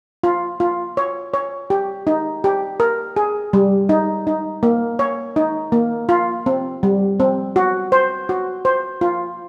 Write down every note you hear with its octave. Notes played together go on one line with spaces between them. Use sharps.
F4
F4
C#5
C#5
G4
D#4
G4
A#4
G#4
G3
D#4
D#4
A#3
C#5
D#4
A#3
F4
C4
G3
C4
F#4
C5
F#4
C5
F4